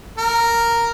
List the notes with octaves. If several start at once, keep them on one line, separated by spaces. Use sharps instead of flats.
A#4